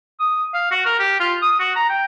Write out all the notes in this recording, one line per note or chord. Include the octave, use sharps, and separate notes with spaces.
D#6
F5
F#4
A#4
G4
F4
D#6
F#4
A#5
G5